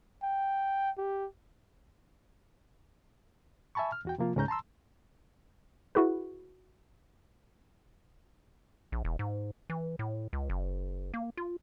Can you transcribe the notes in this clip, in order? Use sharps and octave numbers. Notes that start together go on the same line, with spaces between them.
G5
G4
E5 G#5 A5 B5 C#6
F6
E2 F#4 G5
C3 F3 A#3 F4
C#2 G#2 C#4 A#5 G6
A5 A#5 C6 E6
E4 F#4 G#4 B4
A#1
E1
G#2
E3
A2
C#2
F#1
A#3
F4